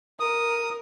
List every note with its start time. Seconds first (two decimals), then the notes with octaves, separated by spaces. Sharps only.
0.20 A#4 D#6